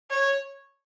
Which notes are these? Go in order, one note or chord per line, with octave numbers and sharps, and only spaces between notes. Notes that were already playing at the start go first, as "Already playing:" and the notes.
C#5